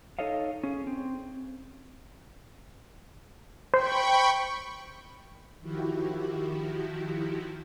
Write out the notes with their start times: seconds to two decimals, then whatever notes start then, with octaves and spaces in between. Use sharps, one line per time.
0.19 D#4 A4 C#5 D#5 F5
0.63 C#4 G#4
0.87 C4
3.74 C5 G5 B5 C#6
5.60 D#3 F3 E4 F#4 G4